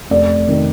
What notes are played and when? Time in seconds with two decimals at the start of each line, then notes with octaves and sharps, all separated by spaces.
0.10 F1 D5
0.48 C3 D#3